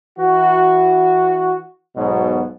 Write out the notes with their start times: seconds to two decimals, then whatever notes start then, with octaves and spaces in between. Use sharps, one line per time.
0.19 E3 F#4
1.96 B1 G#2 B2